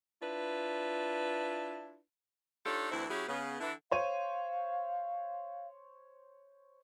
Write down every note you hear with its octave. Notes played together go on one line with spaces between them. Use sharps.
D4 E4 F4 B4
D4 D#4 F4 G4 A4 C#5
D2 E3 C4 E4
F#3 C#4 E4 G4 G#4
C#3 B3
D3 E3 E4
C5 C#5 F5 D#7